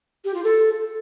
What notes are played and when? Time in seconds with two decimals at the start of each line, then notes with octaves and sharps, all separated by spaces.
0.24 G4
0.34 F4
0.44 A4